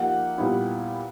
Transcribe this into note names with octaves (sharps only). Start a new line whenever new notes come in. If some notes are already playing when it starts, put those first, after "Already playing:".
Already playing: F3 A#3 D#4 G4 F#5
A#2 G3 B3 E4 G4